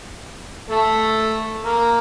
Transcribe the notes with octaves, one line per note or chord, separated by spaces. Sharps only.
A3 A4
A#3 A#4